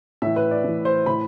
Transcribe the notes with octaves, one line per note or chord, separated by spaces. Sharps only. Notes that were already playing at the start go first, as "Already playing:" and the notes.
A2 E3 E5
B4
D5
A2 E3
C5
A2 E3 B5